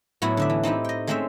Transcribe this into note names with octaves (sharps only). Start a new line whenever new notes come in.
A2 F#3 A3 B3 E4 F#4
D3 D4 E5
E3
C4 D#4 E4 G4
D#5 G5
G#3 A3 C4 C#4 C5 E5